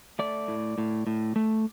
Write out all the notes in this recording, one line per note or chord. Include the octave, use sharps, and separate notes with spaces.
A3 D5
A2
A2
A2
A3